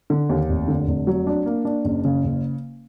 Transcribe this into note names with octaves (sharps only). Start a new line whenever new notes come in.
D3
D#2
F1
D3
F1
F#3
D4
A#3
D4
F#1
C#3
F#1